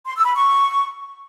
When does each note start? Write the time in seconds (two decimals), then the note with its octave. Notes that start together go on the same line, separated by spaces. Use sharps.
0.06 C6
0.16 E6
0.25 B5
0.35 C#6